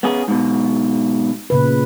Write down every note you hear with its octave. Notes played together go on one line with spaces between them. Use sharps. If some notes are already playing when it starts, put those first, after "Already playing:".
B3 C#4 G#4
G#2 B2
A#2 C#3 B4